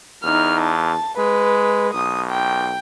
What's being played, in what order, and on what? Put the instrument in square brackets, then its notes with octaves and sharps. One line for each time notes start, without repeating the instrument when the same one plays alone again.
[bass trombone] E2 [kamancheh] D#4 F6
[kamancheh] A5
[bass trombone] G#3 [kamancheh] B4
[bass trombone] B1 [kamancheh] D#6
[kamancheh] G5